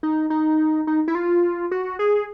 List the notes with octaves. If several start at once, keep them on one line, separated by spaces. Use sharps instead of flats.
D#4
D#4
D#4
E4
F4
F#4
G#4